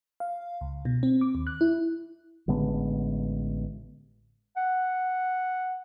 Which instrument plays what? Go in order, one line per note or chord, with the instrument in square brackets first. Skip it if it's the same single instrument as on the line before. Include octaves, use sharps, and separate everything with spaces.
[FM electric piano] F5
C#2
B2
C4
D6
D#2
F#6
E4
[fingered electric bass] A1 D3 G#3 B3
[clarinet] F#5